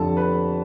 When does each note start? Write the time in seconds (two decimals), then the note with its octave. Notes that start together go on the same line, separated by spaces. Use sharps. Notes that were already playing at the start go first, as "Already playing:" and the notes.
Already playing: F1 F2 D3 F3 A4 A5
0.17 B4 B5